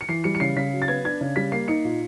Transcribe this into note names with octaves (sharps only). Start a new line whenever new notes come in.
C#7
E3 C7
G3 C#7
C#7
C#3 C7
C#3 B6
F#3
A6
B3 G#6
D4 G#6
C#3
G3 B6
A#3 C7
D#4 C#7
A#2